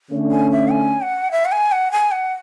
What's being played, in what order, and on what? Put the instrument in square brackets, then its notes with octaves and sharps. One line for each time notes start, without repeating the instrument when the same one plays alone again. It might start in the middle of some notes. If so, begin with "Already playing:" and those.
[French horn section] D3 A3 C#4
[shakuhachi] G#5
E5
G#5
F#5
E5
F#5
G#5
F#5
G#5
F#5